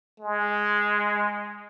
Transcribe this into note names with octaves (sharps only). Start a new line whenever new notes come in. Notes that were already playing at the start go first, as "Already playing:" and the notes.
G#3